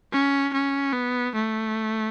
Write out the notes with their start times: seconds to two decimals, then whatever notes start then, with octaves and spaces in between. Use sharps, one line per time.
0.12 C#4
0.53 C#4
0.93 B3
1.34 A3